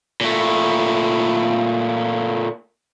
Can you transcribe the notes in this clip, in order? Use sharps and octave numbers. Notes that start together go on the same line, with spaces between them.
A#2 A3